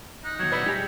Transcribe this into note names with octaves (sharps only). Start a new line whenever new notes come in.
D#4 F#6
D#2 F#3 G#6
B2 B3 B4 D5 E5
G3 G4 G#4